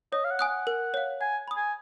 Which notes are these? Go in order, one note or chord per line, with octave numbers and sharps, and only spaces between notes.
C#5 D#5
F5
F#5
G#5 D#6 F#6
F#5
A#4
C#5 F5
F#5 G#5
B5 D#6
G#5